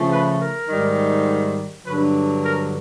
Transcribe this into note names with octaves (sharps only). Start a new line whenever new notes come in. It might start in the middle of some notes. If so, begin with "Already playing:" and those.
Already playing: C#3 F3 A3
B4
A#4
G#2 D#3 G3
G2 D3 F#3 B4
A#4